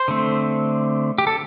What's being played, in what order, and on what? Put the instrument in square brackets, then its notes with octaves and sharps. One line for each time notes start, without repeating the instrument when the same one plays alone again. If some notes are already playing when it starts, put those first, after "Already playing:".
Already playing: [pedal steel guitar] C5
D3 A3 C4
G4
A4